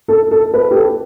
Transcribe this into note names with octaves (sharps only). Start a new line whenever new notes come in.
A4
A4
B4
G4
A4